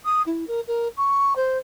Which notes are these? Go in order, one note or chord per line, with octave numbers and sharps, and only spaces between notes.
D#6
E4
A#4
A#4
C#6
C5